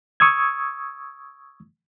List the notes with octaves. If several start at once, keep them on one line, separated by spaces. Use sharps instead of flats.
C#6 D#6 E6 G#6